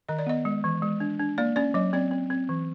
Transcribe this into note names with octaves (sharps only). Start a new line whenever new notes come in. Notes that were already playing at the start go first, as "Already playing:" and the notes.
D#3 D#5
D5
B3 D#5
G#3
E3
G#3
D4
D4
A#3 D5
C#4 D5
F#3 D#5
C4 D5
C4
C4
E3